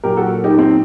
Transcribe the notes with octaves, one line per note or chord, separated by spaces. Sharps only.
A#2 F#3 G4 A#4
F#4 A4
D#4 G4
C4 D#4